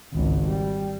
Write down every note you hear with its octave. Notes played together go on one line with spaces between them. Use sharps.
G#1 C#2
G3